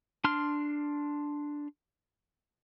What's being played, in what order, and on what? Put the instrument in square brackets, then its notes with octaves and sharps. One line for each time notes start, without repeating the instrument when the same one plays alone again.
[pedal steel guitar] D4 C6 F6